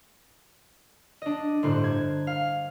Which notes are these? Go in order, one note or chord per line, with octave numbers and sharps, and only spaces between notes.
D4 D#5
G1 A2 C5 F#6
G#6
F5